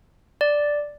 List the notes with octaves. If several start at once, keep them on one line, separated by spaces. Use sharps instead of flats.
D5